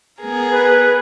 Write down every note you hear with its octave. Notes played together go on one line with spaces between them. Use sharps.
B3 G#4 A#4
B4